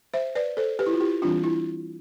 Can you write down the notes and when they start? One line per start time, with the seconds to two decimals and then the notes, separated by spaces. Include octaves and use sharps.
0.14 C5 E5
0.35 B4 D5
0.57 A4 C5
0.79 G4 B4
0.87 E4
0.93 F4
1.00 E4 G4
1.22 E3 G3 C4 D4 F4
1.44 E4